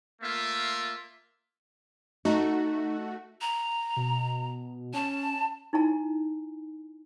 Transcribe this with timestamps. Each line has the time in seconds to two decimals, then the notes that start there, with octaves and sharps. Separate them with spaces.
0.21 A3 A#3 F4 E5
2.25 A3 D#4 F#4
3.41 A#5
3.96 B2
4.94 C#4 A5
5.73 D#4 E4 G#5 A#5